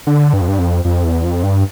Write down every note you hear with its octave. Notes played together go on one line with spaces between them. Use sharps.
D3
G2
F2
G2
F2
F2
E2
F2
G2